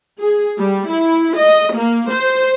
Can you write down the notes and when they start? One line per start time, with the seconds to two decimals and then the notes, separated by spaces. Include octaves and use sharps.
0.20 G#4
0.59 G3
0.90 E4
1.36 D#5
1.76 A#3
2.11 C5